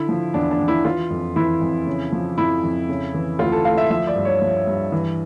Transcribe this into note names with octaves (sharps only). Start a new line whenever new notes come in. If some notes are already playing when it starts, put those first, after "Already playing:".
Already playing: D3 E4
F3
E2 D4
D4
E2
E4
E3 F4
F2
E3 E4
F2
C#3
F3
F2 E4
F2
C#3
E3
D2 F4
A4
D2 F5
E5
F3 E5
D5
G2
C#5
F3
G2
E3